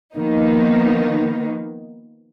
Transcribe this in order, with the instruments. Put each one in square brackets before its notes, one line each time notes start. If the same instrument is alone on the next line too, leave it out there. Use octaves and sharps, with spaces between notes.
[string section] D#3 F3 A#3 B3 D#4